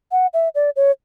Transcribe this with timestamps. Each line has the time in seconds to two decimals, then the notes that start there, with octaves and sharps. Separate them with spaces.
0.12 F#5
0.34 E5
0.55 D5
0.76 C#5